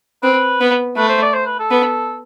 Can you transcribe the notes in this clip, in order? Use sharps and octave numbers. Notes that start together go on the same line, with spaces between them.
C4 B4
B3
A3 B4
C5
D5
C5
B4
A4
B3